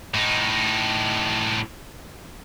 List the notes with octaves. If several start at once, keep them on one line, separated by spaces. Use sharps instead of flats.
A2 D#4